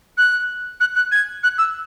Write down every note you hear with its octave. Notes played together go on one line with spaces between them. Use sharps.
F#6
F#6
F#6
G#6
F#6
E6